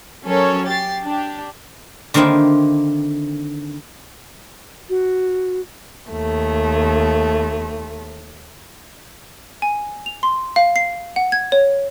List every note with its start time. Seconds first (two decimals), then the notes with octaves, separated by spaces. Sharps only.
0.24 F#3 C#4 A4 A#4 C#5
0.66 G4 A6 C7
1.03 D4 G4
2.14 D3 D#3 A#3 C4 D#4 E4
4.90 F#4
6.09 D#2 A3
9.62 G#5
10.06 F7
10.23 C6
10.56 F5
10.76 C7
11.16 F#5
11.32 G#6
11.52 C#5